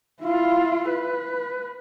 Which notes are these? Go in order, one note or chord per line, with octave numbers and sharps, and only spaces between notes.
E4 F4
B4